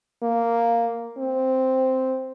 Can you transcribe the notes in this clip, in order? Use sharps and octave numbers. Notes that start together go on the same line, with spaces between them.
A#3
C4